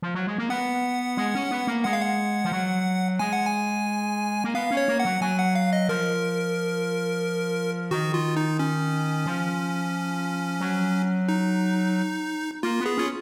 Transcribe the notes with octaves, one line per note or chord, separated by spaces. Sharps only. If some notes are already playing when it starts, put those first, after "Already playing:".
F3
F#3
G#3
A#3
B3 F#5
G#3
C#4
B3
A#3
G#3 F#5
F5
F#5
F3
F#3
G#3 G#5
F#5
G#5
A#3
B3 F5
C#4
C#5
A#3
F#5
F#3
F#3 G#5
F#5
F5
D#5
F3 A#4
D#3 F#4
F4
D#4
C#4
F3
F#3
D#4
A#3 F4
B3
G#4
C#4 F4